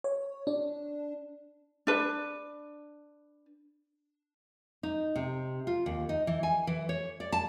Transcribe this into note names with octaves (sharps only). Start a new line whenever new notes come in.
C#5
D4
D4 B4
D#4
C3
F4
D#2
D#4
E3
G#5
E3
C#5
D5
A5